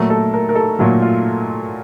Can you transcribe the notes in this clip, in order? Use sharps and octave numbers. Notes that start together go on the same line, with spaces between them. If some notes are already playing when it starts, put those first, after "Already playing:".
Already playing: A#2 F#3 A3 A#4
A4
A#4
A#4
A4
A#2 F#3 A3 F4
F4